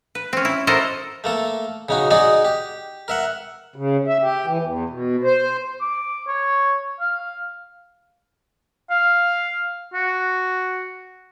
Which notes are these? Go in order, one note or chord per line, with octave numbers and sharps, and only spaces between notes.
B4
C4 C#4
E4
E4 F#4 A4 A#4 C5 D#5
A3 A#3 A4
C#3 D#4 F#4
D#4 F#4 G#4 D5 D#5
G4
A#4 E5 F#5
C#3
E5
G4
E3
E2
B2
C5
D6
C#5
F5
F5
F#4